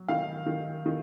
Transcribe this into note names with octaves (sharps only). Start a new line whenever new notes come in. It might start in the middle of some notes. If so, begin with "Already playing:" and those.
Already playing: F#3
D#3 F5
D#3
D#3